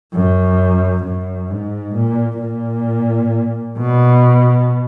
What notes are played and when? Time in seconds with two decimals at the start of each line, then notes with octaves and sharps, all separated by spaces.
0.13 F#2
1.05 F#2
1.50 G#2
1.95 A#2
2.41 A#2
3.78 B2